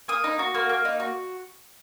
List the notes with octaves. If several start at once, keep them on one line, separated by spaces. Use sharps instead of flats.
A#3 D#6
D#4
F#4
A#3
A#3
D#4
F#4